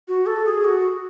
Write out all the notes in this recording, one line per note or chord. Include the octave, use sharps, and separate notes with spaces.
F#4
A4
G#4
F#4